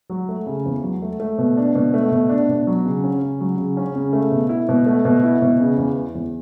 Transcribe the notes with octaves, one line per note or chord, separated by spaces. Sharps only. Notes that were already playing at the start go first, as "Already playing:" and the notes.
F#3
A3
C#3
E2
F#3
A3
A3
B2
D4
B2
A3
B2
D4
B2
F#3
C#3
C#4
C#3
F#3
C#3
C#4
C#3
A3
B2
E4
B2
A3
B2
E4
B2
C#3
E2
E3
E2